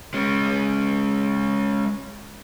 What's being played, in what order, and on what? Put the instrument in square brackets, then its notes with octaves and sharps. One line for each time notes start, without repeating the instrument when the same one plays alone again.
[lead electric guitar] G#3 C#4